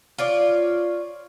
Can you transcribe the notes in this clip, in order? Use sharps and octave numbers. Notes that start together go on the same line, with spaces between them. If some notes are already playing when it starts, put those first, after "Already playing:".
F4 C#5 D5